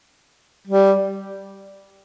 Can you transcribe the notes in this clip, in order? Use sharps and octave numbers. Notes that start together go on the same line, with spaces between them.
G3